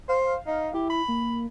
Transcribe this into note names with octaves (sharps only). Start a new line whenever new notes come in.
C5 F5
D#4
E4 G4
B5
A#3